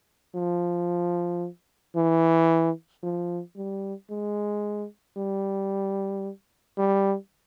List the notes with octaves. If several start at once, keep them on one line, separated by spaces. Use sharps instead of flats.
F3
E3
F3
G3
G#3
G3
G3